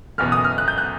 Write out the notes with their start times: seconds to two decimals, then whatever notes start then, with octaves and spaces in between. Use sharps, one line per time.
0.18 F#1 E2 B2 F6
0.32 D#6
0.44 F6
0.58 F#6
0.68 G6
0.78 F#6